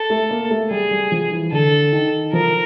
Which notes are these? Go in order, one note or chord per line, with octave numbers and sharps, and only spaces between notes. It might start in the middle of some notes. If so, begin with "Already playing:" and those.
Already playing: A4
A3
A#3
A3
G3 G#4
G3
F3
E3
D3 A4
D#3
F3 A#4